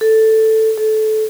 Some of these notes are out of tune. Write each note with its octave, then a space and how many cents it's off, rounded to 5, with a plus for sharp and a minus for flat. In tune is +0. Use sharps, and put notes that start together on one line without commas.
A4 +5
A4 -20